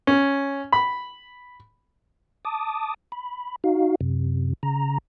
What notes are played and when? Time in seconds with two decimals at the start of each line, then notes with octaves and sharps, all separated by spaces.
0.07 C#4
0.73 B5
2.45 A5 D6 D#6
3.12 B5
3.64 D#4 F#4 F5
4.01 F#2 C3
4.63 C#3 A#5